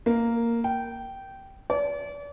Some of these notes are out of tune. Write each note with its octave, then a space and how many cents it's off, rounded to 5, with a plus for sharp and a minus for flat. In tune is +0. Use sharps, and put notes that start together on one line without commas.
A#3 -5
G5 -15
D5 -40